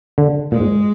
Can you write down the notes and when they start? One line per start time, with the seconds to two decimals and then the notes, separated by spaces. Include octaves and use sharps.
0.18 D3
0.52 A#2 G#3
0.60 G#2